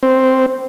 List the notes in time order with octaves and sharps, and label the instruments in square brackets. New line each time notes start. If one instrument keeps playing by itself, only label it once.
[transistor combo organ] C4